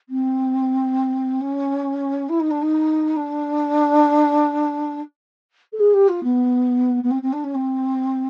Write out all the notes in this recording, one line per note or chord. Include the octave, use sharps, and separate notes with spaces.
C4
C#4
E4
D#4
D4
D#4
D4
A4
G#4
G4
F4
B3
B3
C4
C4
D4
C#4
C4